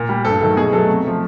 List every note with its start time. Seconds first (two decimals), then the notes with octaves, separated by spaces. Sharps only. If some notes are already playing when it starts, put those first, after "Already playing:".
Already playing: A#2
0.09 G3
0.25 G2 A4
0.41 D#3 F#3 A3
0.57 B2 G#4
0.72 F#3 A3 A4
0.89 C3
1.04 F3 A3